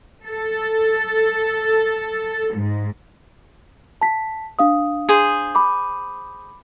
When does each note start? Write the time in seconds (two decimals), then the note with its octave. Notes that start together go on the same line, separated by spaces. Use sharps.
0.25 A4
2.56 G#2
4.01 A5 B6
4.59 D4 F5 D#6
5.09 G#4 C5
5.55 B5 D6